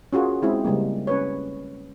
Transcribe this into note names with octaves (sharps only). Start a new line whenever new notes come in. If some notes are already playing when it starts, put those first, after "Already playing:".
C#4 F4 F#4 G#4 A#4
G#3 C4 E4 G#4
C#3 G3 G#3 A#3
C#4 B4 C#5